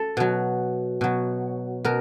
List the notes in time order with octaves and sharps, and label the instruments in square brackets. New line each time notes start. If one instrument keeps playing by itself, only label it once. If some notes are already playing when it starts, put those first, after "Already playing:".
Already playing: [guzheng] A4
B2 F#3
B2 F#3
B2 A#4